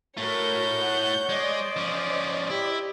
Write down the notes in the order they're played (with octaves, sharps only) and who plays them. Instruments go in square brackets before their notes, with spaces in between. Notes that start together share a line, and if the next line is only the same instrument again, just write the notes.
[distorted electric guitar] A2 A3 [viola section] F#4 A#4 [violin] C#5 G6
[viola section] F#5
[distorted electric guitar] G#3 [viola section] C5 D5 D#5
[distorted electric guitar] F3 C#4
[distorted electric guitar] E4 [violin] G4